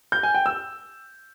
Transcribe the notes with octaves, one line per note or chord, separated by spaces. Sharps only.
G6
G#5
G5
E6